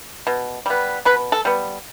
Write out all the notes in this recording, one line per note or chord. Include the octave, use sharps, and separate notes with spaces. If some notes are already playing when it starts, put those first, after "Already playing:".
B2
G3 B3
B2 B4
A4
G3 B3